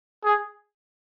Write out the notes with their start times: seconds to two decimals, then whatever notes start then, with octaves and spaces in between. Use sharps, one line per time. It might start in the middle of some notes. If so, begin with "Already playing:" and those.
0.24 G#4